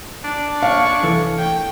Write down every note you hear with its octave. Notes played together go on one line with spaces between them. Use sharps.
D4
C#5 F5 C#6
C2 E3 A4
A2 G5